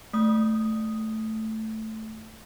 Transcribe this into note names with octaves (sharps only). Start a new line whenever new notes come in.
A3 D#6